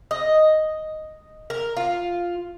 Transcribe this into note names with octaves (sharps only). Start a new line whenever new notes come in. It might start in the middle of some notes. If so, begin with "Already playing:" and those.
D#5
A#4
F4